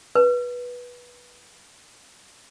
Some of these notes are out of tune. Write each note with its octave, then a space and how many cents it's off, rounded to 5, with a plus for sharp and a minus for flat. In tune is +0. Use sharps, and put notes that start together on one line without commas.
B4 -15